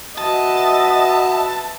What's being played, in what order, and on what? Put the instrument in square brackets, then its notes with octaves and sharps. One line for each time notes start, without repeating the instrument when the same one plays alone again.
[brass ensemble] F#4 B4 E5 [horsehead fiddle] D#5 [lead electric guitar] A5